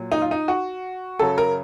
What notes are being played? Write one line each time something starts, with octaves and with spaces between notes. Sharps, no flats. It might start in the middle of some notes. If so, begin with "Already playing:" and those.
Already playing: A#2 F#3
D#4
F4
D#4
F#4
F#2 C#3 F#3 A4
A#4